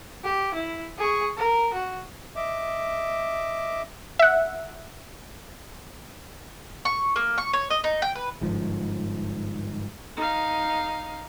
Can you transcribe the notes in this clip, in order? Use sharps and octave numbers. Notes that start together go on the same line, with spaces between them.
G4
E4
G#4 C#6
A#4
F#4
D#5 E5 D6
E5 F#5
C#6
A#3
C#6
C#5
D#5
D#4
G5
B4
G1 G#2 F3
D#4 F5